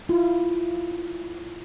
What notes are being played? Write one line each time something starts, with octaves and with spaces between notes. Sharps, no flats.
E4 F4